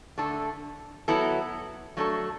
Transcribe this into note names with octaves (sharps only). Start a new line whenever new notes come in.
D3 A3 D4 A4
F#3 B3 E4 A4
F#3 A3 D4 A4